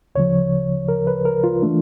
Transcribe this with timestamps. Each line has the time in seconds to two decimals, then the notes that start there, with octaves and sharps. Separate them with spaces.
0.15 D2 C#3 F3 C#5
0.89 A#4
1.07 B4
1.25 A#4
1.44 F4
1.62 E3 A3 D4